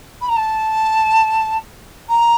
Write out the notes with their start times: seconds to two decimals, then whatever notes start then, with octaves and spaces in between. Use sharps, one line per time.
0.21 B5
0.29 A#5
0.37 A5
2.09 A#5